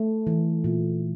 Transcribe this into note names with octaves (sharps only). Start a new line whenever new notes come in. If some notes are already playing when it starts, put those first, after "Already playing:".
Already playing: A3
E3
A#2